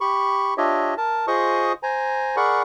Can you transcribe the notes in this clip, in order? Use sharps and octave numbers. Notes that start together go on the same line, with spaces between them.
G4 B5 C#6
D4 F4 G4 C#5 D#5 E5
A#4 A5
F4 G#4 C5 D#5 C#6 D#6
C5 G#5 A#5
G#4 A#4 D5 F#5 B5 C#6